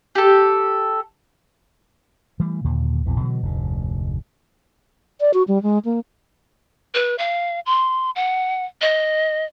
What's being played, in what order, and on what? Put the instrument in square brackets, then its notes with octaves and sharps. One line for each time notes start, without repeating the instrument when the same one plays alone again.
[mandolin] G4 A4
[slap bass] E3 G3 A3
D#2 A#2 D3
A#1 E2 E3
B2 D3 E3 F#3
F1 D2 G#2
[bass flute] D5
F#4
G3
G#3
A#3
[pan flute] B4
F5
C6
F#5
D#5